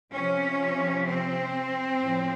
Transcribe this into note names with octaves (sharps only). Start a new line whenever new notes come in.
C3 F3 C#4
C4
A2 F3